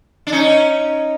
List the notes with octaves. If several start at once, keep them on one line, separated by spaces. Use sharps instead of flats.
D4
C#4 D#4